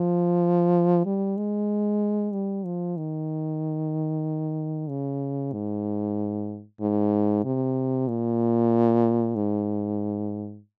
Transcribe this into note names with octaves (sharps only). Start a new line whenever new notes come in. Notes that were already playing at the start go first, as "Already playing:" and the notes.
Already playing: F3
G3
G#3
G3
F3
D#3
C#3
G#2
G#2
C3
A#2
G#2